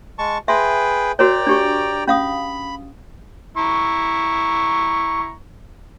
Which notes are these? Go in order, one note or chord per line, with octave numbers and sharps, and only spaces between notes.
G#3 A5 C#6
G#4 B4 E5 G5 C6
F#4 A#4 C#5 D5 G5 A#5
D4 G4 C#6
C#4 F5 B5 D#6
E4 A#5 C#6